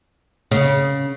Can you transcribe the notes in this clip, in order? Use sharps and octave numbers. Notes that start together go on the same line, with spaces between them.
C#3